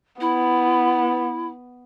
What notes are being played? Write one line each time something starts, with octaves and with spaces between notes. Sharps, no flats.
B3 E4